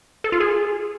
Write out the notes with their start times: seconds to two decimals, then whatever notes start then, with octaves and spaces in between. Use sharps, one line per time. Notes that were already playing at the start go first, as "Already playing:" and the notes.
0.24 A4
0.32 F4
0.40 G#4